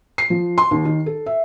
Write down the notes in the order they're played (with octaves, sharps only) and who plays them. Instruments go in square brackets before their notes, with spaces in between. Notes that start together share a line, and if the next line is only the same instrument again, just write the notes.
[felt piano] C7
F3
C6
D#2
D#3
A4
E5